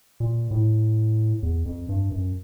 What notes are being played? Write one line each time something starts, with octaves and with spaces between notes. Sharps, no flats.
A#2
A2
E2
F2
G2
F#2